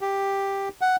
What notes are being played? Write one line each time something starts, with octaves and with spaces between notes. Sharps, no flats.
G4
F#5